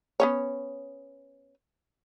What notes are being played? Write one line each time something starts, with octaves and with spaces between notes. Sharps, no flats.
B3 C#4 C#5